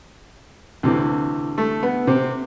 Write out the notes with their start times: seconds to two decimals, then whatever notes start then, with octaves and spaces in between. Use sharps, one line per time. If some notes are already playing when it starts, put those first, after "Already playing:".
0.83 D2 C3 E3
1.58 A3
1.83 B3
2.07 C3 C4